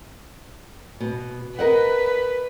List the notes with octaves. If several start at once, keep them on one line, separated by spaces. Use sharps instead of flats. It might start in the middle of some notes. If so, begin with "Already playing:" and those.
B2
A#4 B4 D#5 F#5